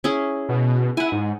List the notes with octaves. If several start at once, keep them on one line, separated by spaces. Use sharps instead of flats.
C#4 E4 G#4
B2
E4 F#5 G#5
G#2